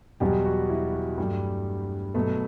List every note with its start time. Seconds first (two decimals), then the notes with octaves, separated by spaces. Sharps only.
0.20 E2 B2 F#3 G3 B3 G4
0.45 F#4
0.70 E4
0.93 F#4
1.18 G2 F#3 G3 A3 G4
2.14 B2 F#3 A3 B3 A4